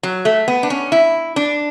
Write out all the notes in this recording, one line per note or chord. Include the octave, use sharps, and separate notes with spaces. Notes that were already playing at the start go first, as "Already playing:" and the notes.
F#3
A3
B3
D4
C#4
E4
D4